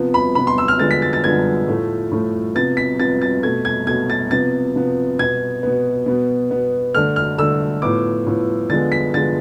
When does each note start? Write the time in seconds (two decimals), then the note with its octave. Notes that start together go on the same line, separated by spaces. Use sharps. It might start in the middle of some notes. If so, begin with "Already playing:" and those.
Already playing: C3 F3 B3
0.14 B5
0.35 C3 F3 B3 B5
0.47 C6
0.58 E6
0.68 F6
0.79 D3 F3 G#3 B3 A6
0.91 B6
1.02 A6
1.13 A6
1.23 D3 F3 G#3 B3 G#6
1.67 A2 F3 A3
2.11 A2 F3 A3
2.55 C3 F3 B3 A6
2.77 B6
2.99 C3 F3 B3 A6
3.22 A6
3.43 B2 A3 G#6
3.65 G#6
3.87 B2 A3 G#6
4.10 A6
4.31 C3 F3 B3 A6
4.75 C3 F3 B3
5.19 B2 B3 G#6
5.63 B2 B3
6.06 B2 B3
6.51 B2 B3
6.94 D3 A3 F6
7.16 F6
7.38 D3 A3 E6
7.82 A2 F3 B3 D6
8.27 A2 F3 B3
8.70 D3 F3 G#3 B3 A6
8.92 B6
9.14 D3 F3 G#3 B3 A6